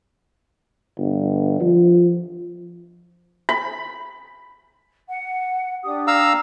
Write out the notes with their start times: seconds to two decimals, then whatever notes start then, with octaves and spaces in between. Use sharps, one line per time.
0.98 G1
1.60 F3
3.49 B5
5.08 F#5
5.83 D4 G4 D#6
6.07 F5 A#5 E6